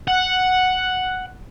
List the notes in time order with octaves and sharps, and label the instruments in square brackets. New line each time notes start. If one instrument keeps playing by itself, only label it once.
[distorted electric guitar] F#5